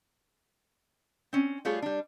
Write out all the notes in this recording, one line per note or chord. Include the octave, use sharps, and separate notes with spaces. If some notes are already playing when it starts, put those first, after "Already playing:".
C4 C#4
G3 A3 F4 G#4 C#5
G3 D4